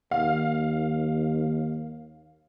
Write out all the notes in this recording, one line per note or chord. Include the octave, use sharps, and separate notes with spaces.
D#2 F5